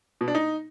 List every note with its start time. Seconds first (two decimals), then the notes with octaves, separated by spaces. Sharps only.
0.21 B2
0.28 D4
0.35 D#4